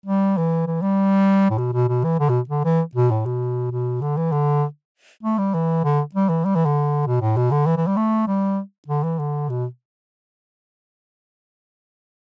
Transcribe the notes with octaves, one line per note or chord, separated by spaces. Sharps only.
G3
E3
E3
G3
A2
B2
B2
B2
E3
D3
B2
D3
E3
B2
A2
B2
B2
D3
E3
D3
A3
G3
E3
D3
G3
E3
G3
E3
D3
B2
A2
B2
D3
E3
E3
G3
A3
G3
D3
E3
D3
B2